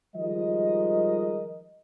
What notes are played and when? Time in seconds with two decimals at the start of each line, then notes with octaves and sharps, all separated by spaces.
0.15 D#3 F3 G3 G#3 A#4 D#5